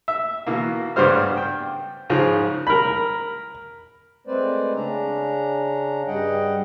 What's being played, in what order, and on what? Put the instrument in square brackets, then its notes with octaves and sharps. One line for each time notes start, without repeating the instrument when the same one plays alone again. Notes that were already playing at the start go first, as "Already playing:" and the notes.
[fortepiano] E5
B2 E3 A#3
G2 C#3 G3 B3 C5 F6
G5
G#2 C#3 F3
A#4 B5
[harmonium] G#3 A3 C4 B4 C5 D5
C#3 C#4 D4 A#5
G2 G3 G#4 D#5 F#5 G5